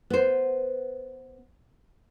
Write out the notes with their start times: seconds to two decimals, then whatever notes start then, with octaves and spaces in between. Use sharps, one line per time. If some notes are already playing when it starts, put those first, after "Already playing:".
0.10 B3 C5